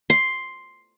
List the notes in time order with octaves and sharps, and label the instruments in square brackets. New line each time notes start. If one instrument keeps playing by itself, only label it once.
[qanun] C6